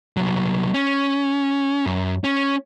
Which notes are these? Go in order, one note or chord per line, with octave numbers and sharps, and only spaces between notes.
C2 F#3
C#4
F#2
C#4